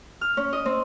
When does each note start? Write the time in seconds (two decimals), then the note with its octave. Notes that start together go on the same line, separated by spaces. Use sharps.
0.21 F6
0.37 C#4
0.53 D#5
0.66 C4